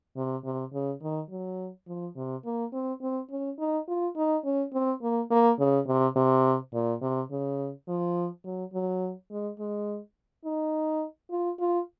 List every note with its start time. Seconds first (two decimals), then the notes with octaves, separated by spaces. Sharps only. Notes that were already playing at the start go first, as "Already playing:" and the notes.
0.16 C3
0.44 C3
0.73 C#3
1.02 D#3
1.30 F#3
1.87 F3
2.16 C3
2.45 A#3
2.73 C4
3.02 C4
3.31 C#4
3.59 D#4
3.88 F4
4.16 D#4
4.44 C#4
4.73 C4
5.02 A#3
5.31 A#3
5.59 C#3
5.87 C3
6.16 C3
6.74 A#2
7.02 C3
7.31 C#3
7.88 F3
8.45 F#3
8.73 F#3
9.31 G#3
9.59 G#3
10.45 D#4
11.31 F4
11.60 F4